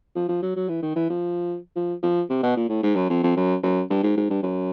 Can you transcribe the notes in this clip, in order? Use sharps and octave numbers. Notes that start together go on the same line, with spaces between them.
F3
F3
F#3
F#3
E3
D#3
E3
F3
F3
F3
C3
B2
A#2
A2
G#2
F#2
F2
F2
F#2
F#2
G2
G#2
G#2
G2
F#2